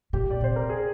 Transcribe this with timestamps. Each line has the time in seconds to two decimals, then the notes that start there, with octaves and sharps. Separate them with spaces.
0.13 A#2 G4
0.31 D5
0.41 C3 C5
0.56 A#4
0.69 G#4